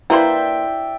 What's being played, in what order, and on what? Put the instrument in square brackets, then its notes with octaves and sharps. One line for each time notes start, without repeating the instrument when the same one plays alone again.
[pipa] A#3 B4 C5 [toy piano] E4 C6 [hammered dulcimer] D5 E5 G5